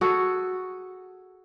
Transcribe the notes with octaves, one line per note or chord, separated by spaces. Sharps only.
F#4 G#4 A4